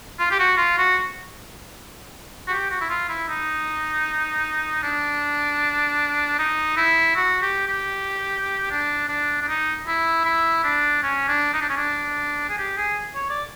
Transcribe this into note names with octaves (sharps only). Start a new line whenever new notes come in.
F4
G4
F#4
F4
F#4
F#4
G4
F#4
E4
F4
E4
D#4
D4
D#4
E4
F#4
G4
G4
D4
D4
D4
D#4
E4
E4
D4
C#4
D4
D#4
D4
C#4
D4
G#4
G4
G#4
C#5
D5